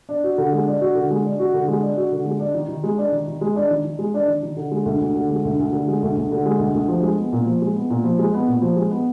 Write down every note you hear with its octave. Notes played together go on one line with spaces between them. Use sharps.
D4
F#4
D3
G#3
D4
F#4
D3
G#3
D4
F#4
D3
G#3
D4
F#4
D3
G#3
D4
D#3
D#3
G#3
D4
D#3
D#3
G#3
D4
D#3
D#3
G#3
D4
D#3
D#3
D3
G#3
D2
D2
D3
G#3
D2
D2
D3
G#3
D2
D2
D3
G#3
D2
D2
F3
G#3
B3
A#2
F3
G#3
B3
A#2
F3
G#3
B3
A#2
F3
G#3
B3